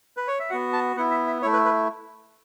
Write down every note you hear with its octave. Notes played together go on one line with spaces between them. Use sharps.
B4
C#5
E5
B3 F#4 F#5
A5
B3 E4 F#5
E5
E5
A3 E4 C#5
B4
B4